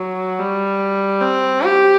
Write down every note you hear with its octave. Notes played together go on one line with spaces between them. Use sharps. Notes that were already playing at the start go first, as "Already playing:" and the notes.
Already playing: F#3
G3
C4
G4